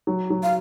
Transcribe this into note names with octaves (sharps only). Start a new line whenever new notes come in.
F#3
F#3
F5